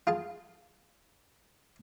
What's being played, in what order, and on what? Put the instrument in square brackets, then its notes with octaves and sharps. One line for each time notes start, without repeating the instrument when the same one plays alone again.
[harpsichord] F4 G#4 A5